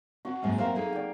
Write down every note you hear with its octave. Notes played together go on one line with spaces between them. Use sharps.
C4 D4 F#4
G#2 F#3 G#3 A#3 C4
C4 A#4 C5 E5 F5
A#3 D#4 G#4 A4
D5 G5